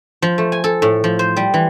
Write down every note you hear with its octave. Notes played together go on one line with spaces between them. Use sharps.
F3
A3
G#5
A4
A2
F3
C5
G3
E3